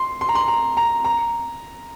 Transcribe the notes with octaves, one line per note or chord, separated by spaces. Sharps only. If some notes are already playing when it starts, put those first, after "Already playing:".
Already playing: C6
C6
A#5
C6
A#5
A#5
A#5